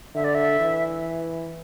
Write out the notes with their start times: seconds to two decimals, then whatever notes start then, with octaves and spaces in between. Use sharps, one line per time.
0.15 D3 E5
0.24 D5
0.35 E5
0.60 E3